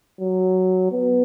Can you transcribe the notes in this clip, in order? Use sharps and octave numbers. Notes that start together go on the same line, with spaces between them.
F#3
B3